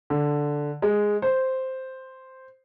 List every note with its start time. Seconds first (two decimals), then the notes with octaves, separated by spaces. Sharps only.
0.10 D3
0.82 G#3
1.22 C5